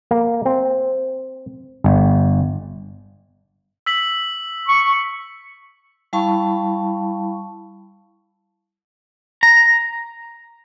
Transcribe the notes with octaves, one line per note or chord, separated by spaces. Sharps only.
A#3
C4
G1
E6 B6 F#7
C#6
G3 E4 F5 A5 B5 C#6
A#5